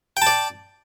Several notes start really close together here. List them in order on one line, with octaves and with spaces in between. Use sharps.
G5 A5 D5